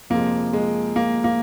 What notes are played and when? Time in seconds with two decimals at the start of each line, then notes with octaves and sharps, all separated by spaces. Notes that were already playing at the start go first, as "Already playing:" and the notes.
0.10 F2 C3 F3 G#3 A#3
0.53 G#3
0.96 A#3
1.24 A#3